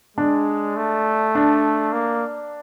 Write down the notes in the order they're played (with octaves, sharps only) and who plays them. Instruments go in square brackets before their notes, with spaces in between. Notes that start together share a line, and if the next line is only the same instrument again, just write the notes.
[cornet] G#3 [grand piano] D4
[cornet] A3
[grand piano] D4
[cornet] A#3